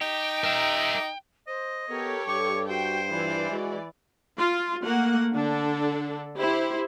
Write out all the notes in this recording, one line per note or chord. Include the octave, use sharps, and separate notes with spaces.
D#4 G4 G5
A#4 E5
C5 D#5
B3 G4 A4 A#4 C#5
G2 C#6 D6
F#4 C5 G5
E3 F4 D5
G#3 F#4
F4
A3 A#3 F#5
D3 D4 A4
E4 G4 C5